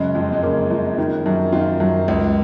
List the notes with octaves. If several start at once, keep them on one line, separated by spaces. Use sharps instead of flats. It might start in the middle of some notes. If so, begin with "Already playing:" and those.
Already playing: F#2 C#3 G#3
F2
G#3
C#3 A#3
F3
D#3
F#2
D#3 F4
F#2
C#2